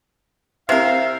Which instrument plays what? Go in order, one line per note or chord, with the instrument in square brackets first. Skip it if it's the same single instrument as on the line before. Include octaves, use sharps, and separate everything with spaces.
[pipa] C3 A#4 [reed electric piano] C4 E4 G4 [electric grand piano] C5 E5 [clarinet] F5